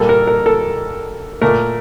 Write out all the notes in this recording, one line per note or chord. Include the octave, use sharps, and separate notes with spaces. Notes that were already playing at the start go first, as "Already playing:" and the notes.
Already playing: A#2 G3 A#3 A4
A#4
A#4
A4
A#2 A3 A#4